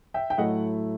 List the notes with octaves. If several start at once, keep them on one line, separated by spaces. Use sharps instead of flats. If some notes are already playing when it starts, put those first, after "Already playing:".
E5 G5
G5
A2 F#3 A3 E4 D#5 F#5